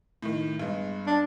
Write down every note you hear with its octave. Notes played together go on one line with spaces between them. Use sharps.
A2 D#3
G2 G#3 B3
D4